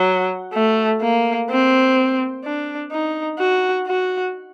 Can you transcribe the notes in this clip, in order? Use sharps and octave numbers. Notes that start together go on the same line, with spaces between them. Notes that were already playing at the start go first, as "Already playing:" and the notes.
Already playing: F#3
A3
A#3
C4
D4
D#4
F#4
F#4